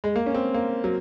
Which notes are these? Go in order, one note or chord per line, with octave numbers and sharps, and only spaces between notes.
G#3
A#3
C#4
C4
A#3
F#3